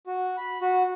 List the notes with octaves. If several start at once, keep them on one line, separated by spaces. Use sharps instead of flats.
F#4
B5
F#4